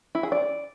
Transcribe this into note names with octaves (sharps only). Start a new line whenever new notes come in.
E4
G#4
D5